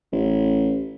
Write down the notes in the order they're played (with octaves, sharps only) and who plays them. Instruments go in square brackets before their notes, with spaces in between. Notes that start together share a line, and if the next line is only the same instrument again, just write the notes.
[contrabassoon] A1